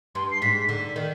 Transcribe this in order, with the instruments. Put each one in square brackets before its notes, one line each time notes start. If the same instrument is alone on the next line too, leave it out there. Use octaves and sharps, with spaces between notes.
[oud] G2 [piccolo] C6
[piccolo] C7
[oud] G#2 [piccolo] B6
[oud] D3
D#3